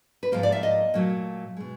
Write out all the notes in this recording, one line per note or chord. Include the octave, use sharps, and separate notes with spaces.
B4
G#2 F3 A#3 C5
D5
E5
D#5
A#2 F#3 A3
B2 G#3